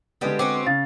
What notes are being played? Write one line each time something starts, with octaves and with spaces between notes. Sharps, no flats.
D3 G3 G#3 B3 G4
C4 C#4 F#4 D6
C#3 F5 A6